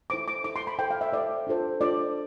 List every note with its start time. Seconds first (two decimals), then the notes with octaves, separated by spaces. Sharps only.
0.10 E4 A4 C5 D6
0.28 D6
0.44 E4 A4 C5 D6
0.56 C6
0.67 B5
0.79 E4 A4 C5 G5
0.91 F5
1.01 E5
1.12 E4 A4 C5 D5
1.47 D4 F4 A4 C5
1.81 D4 F4 A4 C5 D5